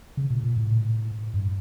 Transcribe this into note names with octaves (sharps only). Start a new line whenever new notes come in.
C#3
A#2
A#2
A2
G2